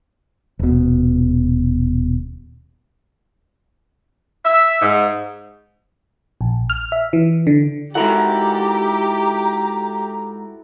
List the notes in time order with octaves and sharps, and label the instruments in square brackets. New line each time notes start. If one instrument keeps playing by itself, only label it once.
[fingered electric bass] D#1 B2
[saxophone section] E5
G#2
[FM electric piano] A#1
F6
E5
E3
D3
[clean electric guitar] G#2 A#4 F#5 [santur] E4 F#4 A4 [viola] G4 [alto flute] A#5